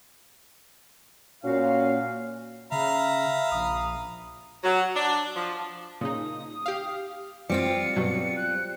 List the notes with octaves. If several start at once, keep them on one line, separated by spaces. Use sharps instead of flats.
A#2 C#4 F#4 F5
C#3 E5 F5 A#5 B5
A#1 D#6
F#3
D4
F3
A#2 C#3 D#4 D#6
G4 F5
G3 C4 F4 C#7
G2 B2 F#3
F#6